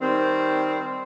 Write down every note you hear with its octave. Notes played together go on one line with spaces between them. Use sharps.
D#3 G3 C4